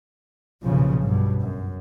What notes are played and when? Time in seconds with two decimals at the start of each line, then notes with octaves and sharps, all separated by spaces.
0.63 B1 G2 A#2 C#3 F3
1.01 G2 B2
1.40 F#2